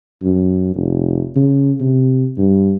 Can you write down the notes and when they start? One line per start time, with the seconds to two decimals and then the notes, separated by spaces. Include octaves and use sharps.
0.23 F#2
0.76 F1
1.36 C#3
1.80 C3
2.38 G2